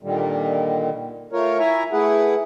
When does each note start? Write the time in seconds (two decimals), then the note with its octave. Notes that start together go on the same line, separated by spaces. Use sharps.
0.02 A#2 D3 D#3 G3
1.33 A3 F4 A#4 C#5
1.59 E4 E5 G#5 A#5
1.92 A3 E4 G#4 B4 F#5